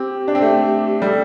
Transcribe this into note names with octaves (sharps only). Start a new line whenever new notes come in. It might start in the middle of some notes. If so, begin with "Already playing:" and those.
Already playing: C4 G4
D4
C4
A3
G3 A4